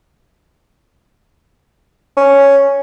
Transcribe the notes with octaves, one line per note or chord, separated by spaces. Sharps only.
C#4